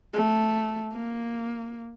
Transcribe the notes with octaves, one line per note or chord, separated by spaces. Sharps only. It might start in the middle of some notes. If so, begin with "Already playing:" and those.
A3
A#3